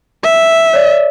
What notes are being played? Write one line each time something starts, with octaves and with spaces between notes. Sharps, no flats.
E5
C#5 D5